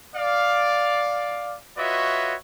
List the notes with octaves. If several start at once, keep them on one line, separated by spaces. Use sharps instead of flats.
D5 F5
F4 F#4 B4 C#5 D#5 E5